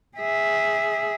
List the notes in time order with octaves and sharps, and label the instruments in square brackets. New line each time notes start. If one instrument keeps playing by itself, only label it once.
[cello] G#4 E5